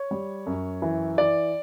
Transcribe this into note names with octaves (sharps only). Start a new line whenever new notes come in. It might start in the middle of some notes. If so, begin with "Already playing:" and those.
Already playing: C#5
G3
F#2
E3
E3 D5